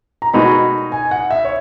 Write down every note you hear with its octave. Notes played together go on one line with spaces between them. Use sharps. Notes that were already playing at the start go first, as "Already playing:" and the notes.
A#5
B2 G#3 D#4 F#4 B5
G#5
F#5
E5
C#5